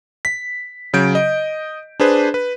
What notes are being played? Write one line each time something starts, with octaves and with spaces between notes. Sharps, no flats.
B6
C#3 F#3 G6 D7
D#5
D4 G#4 B4 C5
B4